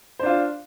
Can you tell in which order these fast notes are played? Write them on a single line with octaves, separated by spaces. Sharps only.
C5 D4 F4